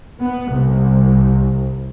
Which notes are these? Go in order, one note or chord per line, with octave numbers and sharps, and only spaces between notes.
B3
C2